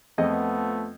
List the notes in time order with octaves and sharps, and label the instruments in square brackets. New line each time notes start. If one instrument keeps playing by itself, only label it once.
[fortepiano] F2 D#5 [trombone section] F3 A3 B3